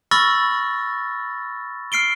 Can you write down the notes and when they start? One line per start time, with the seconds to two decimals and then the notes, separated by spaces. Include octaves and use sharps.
0.11 B5 C#6 E6 F6 A6 A#6
1.92 F6 C7 D7 G7